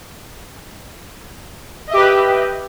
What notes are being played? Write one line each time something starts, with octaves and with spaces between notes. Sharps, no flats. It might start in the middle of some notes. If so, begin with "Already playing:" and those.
G4 B4 D#5 E5